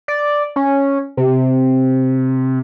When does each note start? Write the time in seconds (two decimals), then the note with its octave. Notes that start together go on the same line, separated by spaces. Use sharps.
0.08 D5
0.56 C#4
1.17 C3